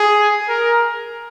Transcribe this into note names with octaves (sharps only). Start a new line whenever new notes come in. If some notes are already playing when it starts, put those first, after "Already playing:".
Already playing: G#4
A#4